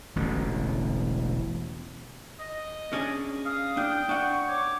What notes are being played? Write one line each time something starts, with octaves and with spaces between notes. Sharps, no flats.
E1 A1 B2 D3
D#5
C#4 D4 G#4
F5 D#6
D4 G5
D4 F#5 C#6
C#5 D6